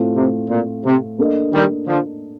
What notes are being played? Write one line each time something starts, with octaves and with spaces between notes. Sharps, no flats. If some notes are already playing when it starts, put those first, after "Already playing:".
Already playing: A2 A3 C4 F4
C3
A#2
C3
A#3 D4 A4 D#5
D#3 G3
D3 F3